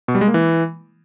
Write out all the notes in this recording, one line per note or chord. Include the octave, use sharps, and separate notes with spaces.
B2
G3
G#3
A#3
E3